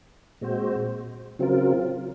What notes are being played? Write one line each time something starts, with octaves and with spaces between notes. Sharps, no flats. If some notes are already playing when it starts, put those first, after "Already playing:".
A#2 G#3 C4 F#4 C5
C#3 F#3 C4 F4 A#4